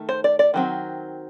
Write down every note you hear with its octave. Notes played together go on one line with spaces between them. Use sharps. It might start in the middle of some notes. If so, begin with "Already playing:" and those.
Already playing: D#3 A3
C5
D5
D5
D#3 F#3 C4